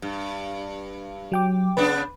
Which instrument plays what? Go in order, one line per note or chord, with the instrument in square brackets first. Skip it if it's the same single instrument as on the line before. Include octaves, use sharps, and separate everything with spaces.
[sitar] G2
[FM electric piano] F#3 G5 D6
[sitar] C#3 B3 D4 [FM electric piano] B4